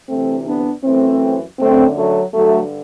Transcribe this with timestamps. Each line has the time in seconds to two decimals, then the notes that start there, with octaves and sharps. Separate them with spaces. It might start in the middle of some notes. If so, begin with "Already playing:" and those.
0.09 D2 C3 E3 A3 C4
0.46 B3 D4
0.84 F#2 E3 A3 C4
1.59 F#2 D3 A3 C4
1.96 F#3 A3
2.34 G2 D3 F#3 A3